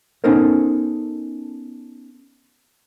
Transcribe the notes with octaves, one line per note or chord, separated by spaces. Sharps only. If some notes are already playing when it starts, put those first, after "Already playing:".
B3 C#4 D#4 A4 A#4 C5